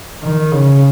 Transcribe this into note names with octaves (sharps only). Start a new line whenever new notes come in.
D#3
C#3